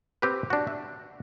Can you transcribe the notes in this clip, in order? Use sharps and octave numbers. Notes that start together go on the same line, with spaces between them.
C4 G4 B4
D4 F#4
E5